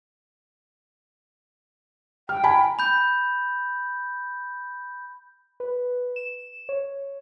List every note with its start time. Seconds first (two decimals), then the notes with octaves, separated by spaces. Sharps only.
2.29 G5 F6
2.44 G#5 A#5 B5
2.79 B5 G6
5.60 B4
6.16 E7
6.69 C#5